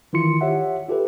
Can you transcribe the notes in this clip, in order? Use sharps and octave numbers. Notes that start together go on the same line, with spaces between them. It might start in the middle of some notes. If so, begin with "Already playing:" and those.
D#3 E3 E4 F4 C6 C#7
G4 C#5 E5 F#5
F4 G4 A4 B4